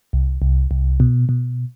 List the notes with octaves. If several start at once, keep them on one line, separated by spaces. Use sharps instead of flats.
C2
C2
C2
B2
B2